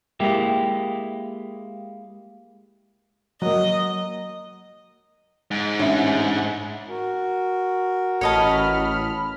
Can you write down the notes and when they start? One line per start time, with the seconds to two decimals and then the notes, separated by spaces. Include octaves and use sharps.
0.20 G#3 A#3 E4 G4
3.42 F#3 A#3 D#5
5.51 G#2
5.80 A1 D4 E5
6.88 F#4 A#4
8.21 A1 C#5 D#5 A5 B5 F6